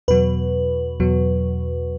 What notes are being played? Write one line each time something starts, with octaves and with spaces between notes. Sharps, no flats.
E2 B2 F#3 B4
E2 B2 F#3